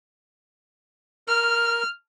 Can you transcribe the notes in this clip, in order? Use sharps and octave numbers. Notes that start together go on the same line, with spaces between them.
A#4 F6